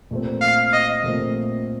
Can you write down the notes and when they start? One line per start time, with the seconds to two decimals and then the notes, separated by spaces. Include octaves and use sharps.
0.11 A#2 A3 C4
0.41 F5
0.73 D#5
1.04 A#2 A3 C4